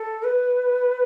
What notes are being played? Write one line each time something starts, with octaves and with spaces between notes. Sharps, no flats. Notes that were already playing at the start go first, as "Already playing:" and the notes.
Already playing: A4
B4